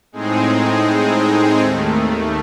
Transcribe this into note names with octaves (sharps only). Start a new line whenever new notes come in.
A2 G#3 C4 D#4 G#4
D#2 D#3 A3